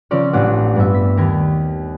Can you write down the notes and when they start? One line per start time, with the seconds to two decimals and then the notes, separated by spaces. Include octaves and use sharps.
0.11 C#3 F3 C4 C#4 D5
0.33 A1 A2 D4 D5 F#5
0.76 G2 B3 E5
0.94 B6
1.17 D#2 A#4 G#6